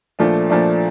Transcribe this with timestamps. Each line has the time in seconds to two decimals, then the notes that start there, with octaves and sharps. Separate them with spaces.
0.19 A#2 F3 A3 D4
0.49 A#2 F3 A3 D4